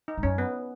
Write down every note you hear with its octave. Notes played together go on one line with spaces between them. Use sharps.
D#4
G#2
F#2 C#4
B3